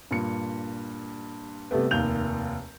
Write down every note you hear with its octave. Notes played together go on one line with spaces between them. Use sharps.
G2 A#2 C#7
C3 G3 A3 B3
F1 D#2 A#3 G6 F7